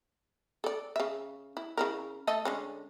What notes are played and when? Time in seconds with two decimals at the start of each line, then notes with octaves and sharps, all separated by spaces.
0.64 A4 D5
0.96 C#3 E5
1.57 E4
1.77 C#3 E4 A#4
2.27 A3 A4 D#5
2.45 D3 G#3 C#4